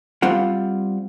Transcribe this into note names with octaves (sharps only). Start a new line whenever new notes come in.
G3 C4 F4 F#5